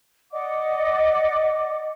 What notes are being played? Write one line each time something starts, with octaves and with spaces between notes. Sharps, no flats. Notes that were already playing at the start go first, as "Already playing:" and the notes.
D5 D#5 F#5 D6